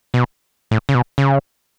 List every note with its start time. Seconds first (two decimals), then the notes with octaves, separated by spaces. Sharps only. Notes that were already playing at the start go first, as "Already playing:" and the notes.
0.14 B2
0.71 A2
0.89 C#3
0.95 B2
1.18 C#3